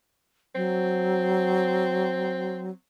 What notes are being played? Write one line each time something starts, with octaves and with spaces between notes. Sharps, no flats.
F#3 C4